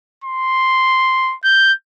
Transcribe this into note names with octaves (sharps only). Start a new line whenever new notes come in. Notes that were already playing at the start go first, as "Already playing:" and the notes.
C6
G6